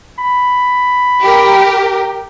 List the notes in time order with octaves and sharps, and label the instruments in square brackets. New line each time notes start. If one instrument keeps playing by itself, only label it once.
[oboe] B5
[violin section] G4 A#4